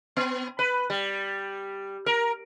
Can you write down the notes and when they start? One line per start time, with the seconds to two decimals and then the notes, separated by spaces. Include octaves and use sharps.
0.17 B3
0.59 B4
0.90 G3
2.06 A#4